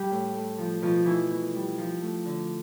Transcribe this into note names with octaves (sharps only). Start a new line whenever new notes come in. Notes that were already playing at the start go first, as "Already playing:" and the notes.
Already playing: G3 G4
A2
A3
F3
B2 F3 F4
B2 E3 E4
B2
G3
F3
A3
D3